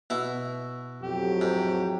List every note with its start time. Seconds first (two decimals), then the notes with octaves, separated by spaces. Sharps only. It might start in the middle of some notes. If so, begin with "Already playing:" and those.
0.10 B2 E4
1.03 F2 A2 F#3 G4
1.41 G#2